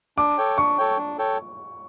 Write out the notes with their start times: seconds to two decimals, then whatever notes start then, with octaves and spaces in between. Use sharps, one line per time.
0.17 D4 D6
0.38 A4 C#5 G5
0.58 D4 C#6
0.78 A4 C#5 G5
0.97 D4
1.18 A4 C#5 G5